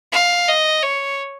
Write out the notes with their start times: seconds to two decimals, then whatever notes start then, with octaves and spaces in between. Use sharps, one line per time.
0.12 F5
0.48 D#5
0.83 C#5